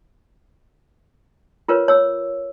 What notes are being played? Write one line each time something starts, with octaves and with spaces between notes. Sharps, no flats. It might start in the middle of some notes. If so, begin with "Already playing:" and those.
F4 A#4 B4 C#5
C#5 E6